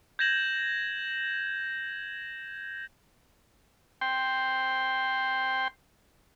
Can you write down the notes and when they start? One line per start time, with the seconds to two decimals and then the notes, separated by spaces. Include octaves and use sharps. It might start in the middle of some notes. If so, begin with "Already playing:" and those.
0.19 G6 G#6 A#6 E7 F#7
4.01 G5 C6